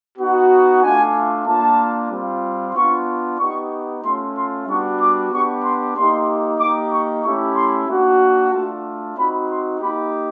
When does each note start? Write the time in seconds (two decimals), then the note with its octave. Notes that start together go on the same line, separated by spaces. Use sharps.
0.19 B3 D#4 F#4
0.83 A3 D4 F4 G#5
1.47 A#3 D4 F4 A5
2.11 G3 C4 F4
2.76 B3 D4 F4 C#6
3.39 B3 D#4 G4 C#6
4.03 A3 C#4 F4 C6
4.36 C6
4.67 G3 B3 D4 F#4 C#6
5.00 D6
5.32 B3 D4 G4 C#6
5.64 C6
5.96 A#3 D#4 G4 C6
6.60 A#3 D#4 G4 D6
6.93 C#6
7.24 A3 C#4 E4 G4 C#6
7.56 C6
7.89 A#3 D4 F#4
8.52 A3 D4 F4 A5
9.17 C4 D#4 F#4 B5
9.49 C6
9.81 A#3 D#4 G4 B5